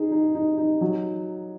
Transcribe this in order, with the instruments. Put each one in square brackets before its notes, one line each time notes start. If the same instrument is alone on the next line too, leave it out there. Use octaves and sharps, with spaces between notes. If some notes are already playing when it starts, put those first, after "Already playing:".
Already playing: [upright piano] D#4 G#4
D#4
D#4
D#4
F#3